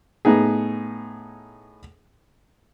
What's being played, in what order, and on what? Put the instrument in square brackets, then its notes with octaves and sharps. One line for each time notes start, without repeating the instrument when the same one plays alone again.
[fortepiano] A2 B3 D#4 G#4